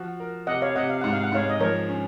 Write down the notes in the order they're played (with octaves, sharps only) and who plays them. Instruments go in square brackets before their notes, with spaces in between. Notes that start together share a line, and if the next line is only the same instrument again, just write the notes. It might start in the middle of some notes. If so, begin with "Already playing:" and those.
Already playing: [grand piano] F3 F#4
A#4
[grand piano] C3 [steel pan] D#5 F#5
[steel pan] C#5 F5
[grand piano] C3 [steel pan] D#5 F#5
[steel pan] F5
[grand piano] G#2 [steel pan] F#5
[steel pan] F5
F#5
[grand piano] G#2 [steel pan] C#5 F5
[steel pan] D#5
[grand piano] F3 [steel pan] A#4 C#5
[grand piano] C#4